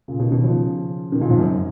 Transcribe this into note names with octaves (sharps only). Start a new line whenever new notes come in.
A#2 C#3
B2 D#3
B2 D#3
C#3 F3
B2 D#3
A#2 C#3
F2 G#2
F#2